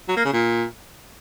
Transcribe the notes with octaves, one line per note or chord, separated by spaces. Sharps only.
F#3
A#3
C#3
A#2